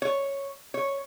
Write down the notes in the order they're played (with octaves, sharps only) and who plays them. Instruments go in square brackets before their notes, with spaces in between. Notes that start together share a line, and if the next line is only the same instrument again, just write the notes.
[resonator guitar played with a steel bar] C#5
C#5